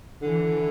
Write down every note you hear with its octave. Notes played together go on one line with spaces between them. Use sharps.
D3 E3